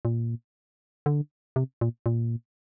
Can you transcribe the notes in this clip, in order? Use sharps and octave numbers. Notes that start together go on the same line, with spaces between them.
A#2
D3
C3
A#2
A#2